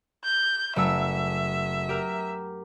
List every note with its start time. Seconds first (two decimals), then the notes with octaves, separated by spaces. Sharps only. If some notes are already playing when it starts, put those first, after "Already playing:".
0.24 G6
0.76 F#1 A3 E5 E6
1.89 G4 A#4